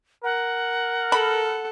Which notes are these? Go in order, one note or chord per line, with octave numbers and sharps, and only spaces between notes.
A#4 F#5
A4 B5